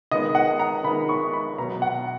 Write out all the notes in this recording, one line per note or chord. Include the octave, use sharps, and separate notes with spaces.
D#3 G#3 B3 D#5
F#5
A#5
D#3 G#3 B3 B5
C#6
B5
B2 F#3 B3 A#5
F#5